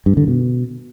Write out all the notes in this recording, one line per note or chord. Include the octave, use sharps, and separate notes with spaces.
G2
D3
B2